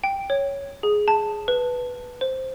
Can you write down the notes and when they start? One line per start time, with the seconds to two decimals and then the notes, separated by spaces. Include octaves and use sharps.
0.04 G5
0.30 C#5
0.83 G#4
1.08 A5
1.48 B4
2.21 C5